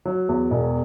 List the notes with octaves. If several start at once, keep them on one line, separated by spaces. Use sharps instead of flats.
F#3
E2
E1